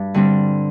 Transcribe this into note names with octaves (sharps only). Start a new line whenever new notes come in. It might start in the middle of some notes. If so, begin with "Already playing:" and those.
Already playing: G2
D3 G3 C4